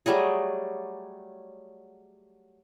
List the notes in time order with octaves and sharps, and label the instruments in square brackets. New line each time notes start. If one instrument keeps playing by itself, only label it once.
[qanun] F#3 G3 A3 G#4